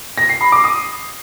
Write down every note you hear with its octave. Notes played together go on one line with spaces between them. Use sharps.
A#6
C7
B5
D6
D#6